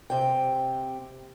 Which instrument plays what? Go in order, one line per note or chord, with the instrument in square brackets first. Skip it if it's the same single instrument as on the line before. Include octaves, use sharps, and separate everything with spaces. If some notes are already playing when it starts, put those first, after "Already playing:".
[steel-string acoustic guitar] C3 G5